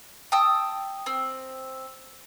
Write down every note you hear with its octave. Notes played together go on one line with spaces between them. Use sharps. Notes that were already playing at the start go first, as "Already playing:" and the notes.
G5 A5 D#6 E6
C4